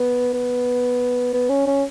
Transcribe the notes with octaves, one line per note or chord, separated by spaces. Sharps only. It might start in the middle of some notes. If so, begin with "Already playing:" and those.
Already playing: B3
B3
B3
C#4
C#4